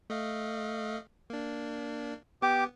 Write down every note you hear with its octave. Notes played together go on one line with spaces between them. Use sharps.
A3 D#5 F5
A#3 D4
B3 G4 D6